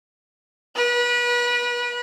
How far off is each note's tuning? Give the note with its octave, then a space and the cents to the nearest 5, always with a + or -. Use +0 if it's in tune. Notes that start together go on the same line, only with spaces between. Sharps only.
B4 -30